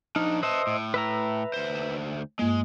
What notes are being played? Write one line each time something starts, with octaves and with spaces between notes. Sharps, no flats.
F3 D4 D#4 F6
B4 C5 D#5 E5 A5
A2
B4 E5 A#5
D2 C5
G2 G#3 A#3